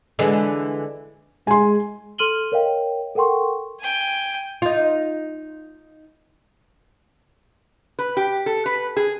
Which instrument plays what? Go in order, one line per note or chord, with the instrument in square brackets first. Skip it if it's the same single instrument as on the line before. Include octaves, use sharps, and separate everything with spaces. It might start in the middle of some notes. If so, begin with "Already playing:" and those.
[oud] D3 E3 G#3
[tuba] G#3 [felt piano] G#5 C6
[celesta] A4 C6 F6 D#7 F#7 G7
A#4 C#5 D#5 F5 G5
A4 A#4 F#5 G5 C6 C#6
[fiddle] G5 G#5
[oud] D#4 F4
[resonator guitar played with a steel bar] B4
G4
A4
B4
G#4